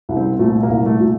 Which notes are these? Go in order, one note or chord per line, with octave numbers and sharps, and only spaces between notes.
C2
C4
A#2 A3
A#3
C2
A3
A#2